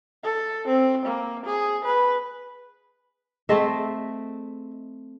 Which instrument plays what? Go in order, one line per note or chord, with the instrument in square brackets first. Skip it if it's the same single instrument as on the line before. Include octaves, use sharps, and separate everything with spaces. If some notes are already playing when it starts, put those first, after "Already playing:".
[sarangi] A4
C4
A#3
G#4
B4
[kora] A3 C4 E5 [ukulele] G#4 A4 D#5